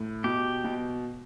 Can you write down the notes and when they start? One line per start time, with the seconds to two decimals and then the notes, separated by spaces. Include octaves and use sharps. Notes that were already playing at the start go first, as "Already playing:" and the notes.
Already playing: A2
0.24 B2 G4
0.64 B2